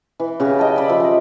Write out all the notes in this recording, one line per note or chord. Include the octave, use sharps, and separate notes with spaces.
E3
C#3 F#4 G4
D#5 G5 A5
D5 B5
F3 E5
G#4 D#5